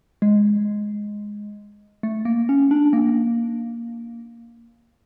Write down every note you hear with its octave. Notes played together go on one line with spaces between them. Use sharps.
G#3
A3
A#3
C#4
D4
A#3